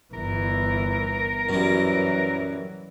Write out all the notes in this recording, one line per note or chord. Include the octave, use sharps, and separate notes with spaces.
G1 E3 A#4
F#2 E3 F#3 G3